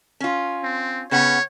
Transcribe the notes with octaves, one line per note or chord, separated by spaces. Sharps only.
C#4 F4
C4
C#3 B3 C#5 F#5